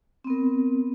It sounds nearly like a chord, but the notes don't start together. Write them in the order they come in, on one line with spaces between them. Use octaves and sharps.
C4 B3 A#4